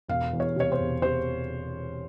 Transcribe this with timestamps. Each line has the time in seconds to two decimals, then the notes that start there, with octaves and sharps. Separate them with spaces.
0.08 E1 F5
0.33 E2
0.40 C#5
0.56 C3 C#5
0.72 C5
0.80 E1
1.02 C3 C5